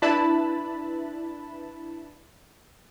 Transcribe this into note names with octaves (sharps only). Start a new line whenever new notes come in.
D4 E4 B4 A5 B5